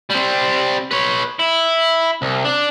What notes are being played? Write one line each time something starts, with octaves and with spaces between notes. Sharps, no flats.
G3 C4
B4 C#5
E4
C2
D4